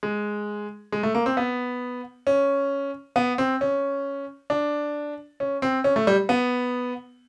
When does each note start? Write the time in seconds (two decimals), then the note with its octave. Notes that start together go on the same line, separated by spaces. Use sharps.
0.03 G#3
0.92 G#3
1.03 A3
1.15 A#3
1.26 C4
1.37 B3
2.27 C#4
3.16 B3
3.38 C4
3.61 C#4
4.50 D4
5.40 C#4
5.62 C4
5.84 C#4
5.96 A3
6.07 G3
6.29 B3